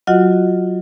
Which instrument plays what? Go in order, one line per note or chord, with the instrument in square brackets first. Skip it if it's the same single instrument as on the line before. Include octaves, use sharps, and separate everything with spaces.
[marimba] F#3 F4 F#4 D#5 F#5